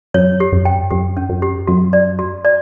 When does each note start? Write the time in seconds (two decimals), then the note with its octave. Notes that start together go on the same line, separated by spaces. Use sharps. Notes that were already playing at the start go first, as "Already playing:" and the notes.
0.14 F#2 C#5
0.40 G4
0.53 F#2
0.65 G5
0.91 F#2 G4
1.17 C#4
1.29 F#2
1.42 G4
1.67 F#2 F#4
1.93 D5
2.19 F#4
2.45 D5